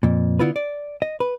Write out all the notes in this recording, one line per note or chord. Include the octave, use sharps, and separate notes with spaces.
F2 A#2
D3 B3 E4 F4 B4
D5
D#5
B4